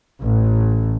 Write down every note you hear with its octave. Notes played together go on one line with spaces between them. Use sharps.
A1